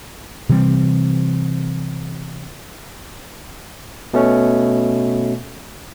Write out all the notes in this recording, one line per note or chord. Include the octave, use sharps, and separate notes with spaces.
C3 E3 G3 C4
B2 A3 C#4